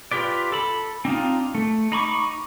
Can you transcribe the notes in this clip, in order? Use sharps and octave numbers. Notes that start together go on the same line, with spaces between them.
F4 G4 B4 D5
A4 B5
C4 D4 D#4 F4
A3
D#4 B5 C#6 D6